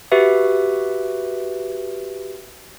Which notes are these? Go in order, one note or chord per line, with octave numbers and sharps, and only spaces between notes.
F#4 G4 B4 E5